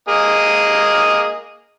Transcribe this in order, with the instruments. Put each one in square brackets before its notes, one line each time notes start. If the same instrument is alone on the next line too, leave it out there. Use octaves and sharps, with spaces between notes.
[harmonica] A#3 G#4 D#5